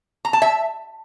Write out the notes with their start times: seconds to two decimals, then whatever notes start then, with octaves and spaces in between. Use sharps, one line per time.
0.25 A#5
0.33 A5
0.42 E5